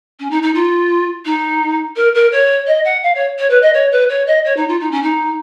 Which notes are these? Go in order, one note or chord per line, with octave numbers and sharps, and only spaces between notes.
C#4
D#4
D#4
F4
D#4
A#4
A#4
C#5
D#5
F#5
F5
C#5
C#5
B4
D#5
C#5
B4
C#5
D#5
C#5
D#4
F4
D#4
C#4
D#4